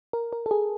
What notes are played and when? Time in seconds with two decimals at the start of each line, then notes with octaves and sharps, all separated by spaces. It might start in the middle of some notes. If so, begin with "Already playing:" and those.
0.13 A#4
0.33 A#4
0.46 A4
0.51 G#4